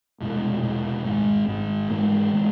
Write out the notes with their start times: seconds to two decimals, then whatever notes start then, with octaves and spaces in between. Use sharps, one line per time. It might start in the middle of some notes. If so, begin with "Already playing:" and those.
0.20 F1 E2 B2 G#3
0.63 F1 E2 B2 G#3
1.05 G#1 G#2 G#3
1.48 G#1 G#2 G#3
1.90 G#2 E3 G#3
2.34 E3 G#3